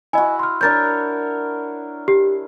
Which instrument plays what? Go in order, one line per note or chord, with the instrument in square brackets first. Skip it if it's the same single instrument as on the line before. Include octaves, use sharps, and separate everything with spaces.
[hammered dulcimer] E4 F#4 [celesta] D#5 G#5
[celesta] C6 F6
[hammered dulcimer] D4 A#4 C#5 [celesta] G6 A6
[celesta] G4